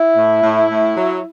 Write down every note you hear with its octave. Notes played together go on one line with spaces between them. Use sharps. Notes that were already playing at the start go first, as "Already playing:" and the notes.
Already playing: E4
A2
A2
A2
F#3